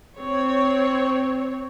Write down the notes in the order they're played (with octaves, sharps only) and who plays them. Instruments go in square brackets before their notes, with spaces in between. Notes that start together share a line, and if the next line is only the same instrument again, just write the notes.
[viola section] C4 C#5